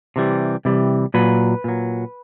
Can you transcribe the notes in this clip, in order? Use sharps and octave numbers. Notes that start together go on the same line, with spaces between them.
C3 E3 G3
C3 E3 G3
A#2 F#3 B4
A#2 F#3